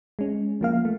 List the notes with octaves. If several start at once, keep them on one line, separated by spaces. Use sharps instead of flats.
G#3 C#4
F3 A#3 F5
A3